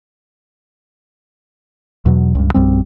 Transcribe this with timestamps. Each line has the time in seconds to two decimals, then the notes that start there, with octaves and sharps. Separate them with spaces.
2.06 E2 B2 F#3
2.35 C#2 G2
2.54 A#1 F#2 G3 C4